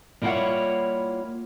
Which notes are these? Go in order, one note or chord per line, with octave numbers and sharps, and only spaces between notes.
G3 A#3 E4 F4 C#5 F#5